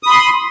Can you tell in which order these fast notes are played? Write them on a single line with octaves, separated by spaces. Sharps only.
D#6 B5 C6